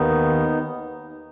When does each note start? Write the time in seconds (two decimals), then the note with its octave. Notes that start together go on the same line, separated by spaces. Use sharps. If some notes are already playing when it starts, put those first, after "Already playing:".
Already playing: D#2 D#3 B3 D#4